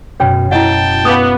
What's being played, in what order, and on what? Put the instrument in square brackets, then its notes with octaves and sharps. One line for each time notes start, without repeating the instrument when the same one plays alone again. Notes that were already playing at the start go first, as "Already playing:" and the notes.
[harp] F#2 B2 [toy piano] C#5 G5
[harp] B2 D#5 G#6 [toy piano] E4 F#5 [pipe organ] G5 A5
[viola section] B3 [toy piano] F5 D6 D#6